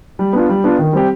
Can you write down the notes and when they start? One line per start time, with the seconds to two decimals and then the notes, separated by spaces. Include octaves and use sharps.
0.19 G3
0.33 B3 D4 F4
0.49 G3
0.64 B3 D4 F4
0.79 D#3
0.93 G3 C4 G4